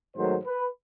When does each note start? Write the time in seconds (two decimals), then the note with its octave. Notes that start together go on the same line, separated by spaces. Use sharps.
0.15 G#2 D#3 F#3 A3 C5
0.44 B4